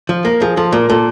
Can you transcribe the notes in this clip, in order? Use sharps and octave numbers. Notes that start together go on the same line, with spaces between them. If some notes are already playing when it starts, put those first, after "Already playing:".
F3
A#3 A#4
F3 G#4
F3 A4
A#2 A#4
A#2 A4